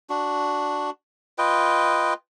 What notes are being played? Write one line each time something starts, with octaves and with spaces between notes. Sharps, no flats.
D4 F#4
F4 B4 D#5 G5